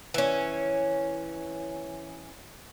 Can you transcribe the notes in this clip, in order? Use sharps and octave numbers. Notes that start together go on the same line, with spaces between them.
E3 C#4